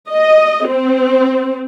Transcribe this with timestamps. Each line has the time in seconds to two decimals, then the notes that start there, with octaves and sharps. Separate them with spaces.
0.12 D#5
0.69 C4